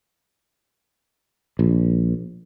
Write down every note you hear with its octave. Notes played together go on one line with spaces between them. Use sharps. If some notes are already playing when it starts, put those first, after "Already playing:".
A#1